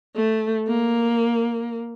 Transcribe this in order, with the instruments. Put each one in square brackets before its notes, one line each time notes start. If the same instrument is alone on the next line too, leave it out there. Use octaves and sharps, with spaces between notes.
[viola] A3
A#3